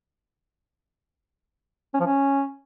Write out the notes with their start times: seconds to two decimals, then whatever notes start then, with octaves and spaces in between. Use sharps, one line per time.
1.94 C#4
2.00 F3
2.06 C#4